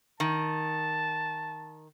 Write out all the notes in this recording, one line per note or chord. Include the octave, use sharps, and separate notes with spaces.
D#3 A5